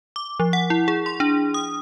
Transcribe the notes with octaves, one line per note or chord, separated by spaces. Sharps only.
D6
F3
F#5
E4
G#4
C6
D4
D#6